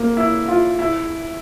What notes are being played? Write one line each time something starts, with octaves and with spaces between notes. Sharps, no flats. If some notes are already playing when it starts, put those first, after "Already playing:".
Already playing: A#3
E4
F4
E4